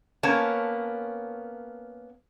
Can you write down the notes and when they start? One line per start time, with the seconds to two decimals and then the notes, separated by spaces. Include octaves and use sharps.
0.23 A#3 B3 C#4 C#5 A5